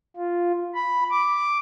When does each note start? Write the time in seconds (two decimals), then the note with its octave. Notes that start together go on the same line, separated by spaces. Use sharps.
0.16 F4
0.75 B5
1.11 D6